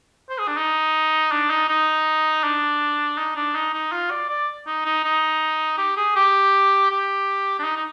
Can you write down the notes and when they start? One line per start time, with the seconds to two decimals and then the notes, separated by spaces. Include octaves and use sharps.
0.29 C5
0.39 G#4
0.48 D4
0.57 D#4
1.31 D4
1.50 D#4
1.69 D#4
2.44 D4
3.18 D#4
3.36 D4
3.55 D#4
3.74 D#4
3.92 F4
4.10 D5
4.29 D5
4.67 D#4
4.85 D#4
5.04 D#4
5.78 G4
5.97 G#4
6.16 G4
6.90 G4
7.59 D4
7.64 D#4
7.77 D#4